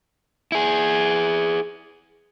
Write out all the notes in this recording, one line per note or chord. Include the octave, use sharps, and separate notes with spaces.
E4 G#4